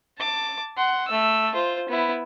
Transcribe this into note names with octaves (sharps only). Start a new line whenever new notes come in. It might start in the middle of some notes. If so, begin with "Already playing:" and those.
A5 D6
F#5 C6
A3 E6
F4 C5
B3 E4